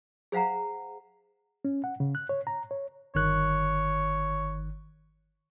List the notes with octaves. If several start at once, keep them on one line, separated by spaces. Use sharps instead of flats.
G#4 C5 F5 F#5 A#5
C#4
F#5
C#3
F#6
C#5
A#5
C#5
G1 D#3 C#5 F#6